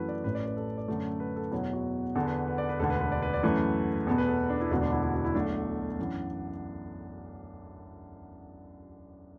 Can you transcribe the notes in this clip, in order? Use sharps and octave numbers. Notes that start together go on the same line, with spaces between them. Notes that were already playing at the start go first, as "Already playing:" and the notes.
Already playing: F#2 E3 A3 E4 F#4 B4
D5
A1 A2 A3 B4
D5
B4
A4
D5
F#2 D3 A3
B4
A4
E2 B2 F#3 E4
F#4
E2 D3 B3 A4
B4
B4
D5
B4
E1 D2 D3 A4
B4
B4
D5
B4
D5
F#2 E3 A3 B4
E2 B2 B3 A4
B4
A4
D4
E4
E1 D2 D3 B3 F#4
D4
E4
E4
F#4
E4
B1 B2 A3 D4
F#2 E3 B3